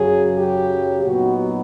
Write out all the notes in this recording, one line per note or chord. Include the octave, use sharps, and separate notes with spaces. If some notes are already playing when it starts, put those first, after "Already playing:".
Already playing: F#2 C#3 F#3 G#4
G4
A#2 F#3 B3 D#4 F#4